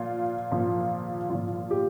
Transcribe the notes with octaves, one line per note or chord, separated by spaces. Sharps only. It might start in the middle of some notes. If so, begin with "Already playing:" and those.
Already playing: A#2 F3 F4
A#2 F3
A#2 F3 F4
G4